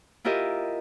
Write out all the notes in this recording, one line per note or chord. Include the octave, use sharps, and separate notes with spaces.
E4 F4 G4 A#4 D#5 E5